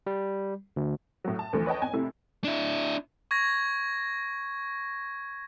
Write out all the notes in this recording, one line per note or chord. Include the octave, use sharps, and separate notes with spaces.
G3
D2
A2 F#3
A5
D2 E3 F3 A3
B4 C#5 D#5 G5 A5
G#1 E2 G#5
C3 A3 E4
D4 E4
C#6 G#6 A#6